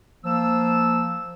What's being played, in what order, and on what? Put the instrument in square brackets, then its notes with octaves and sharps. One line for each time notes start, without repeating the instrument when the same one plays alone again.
[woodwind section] F3 A#3 E6